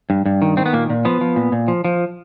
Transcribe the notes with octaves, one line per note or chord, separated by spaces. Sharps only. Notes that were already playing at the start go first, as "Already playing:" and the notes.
G2
G2
D#3
D#3 C4
B3
A#2 A#3
A#2
F3 B3
F3
A#2
A#2
F3
F3